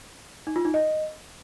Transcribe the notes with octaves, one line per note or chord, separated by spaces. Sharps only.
D#4
F4
D#4
D#5